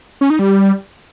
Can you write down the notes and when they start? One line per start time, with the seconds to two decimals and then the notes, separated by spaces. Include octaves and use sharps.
0.21 C#4
0.30 D#4
0.39 G3